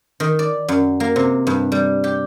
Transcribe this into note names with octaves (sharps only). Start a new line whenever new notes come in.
D#3
D5
F#2
A#3
C3
G2
G3
G4